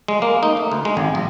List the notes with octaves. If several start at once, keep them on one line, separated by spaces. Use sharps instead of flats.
G#3
A#3
D#4
A3
D2
G#3
G#1
A#1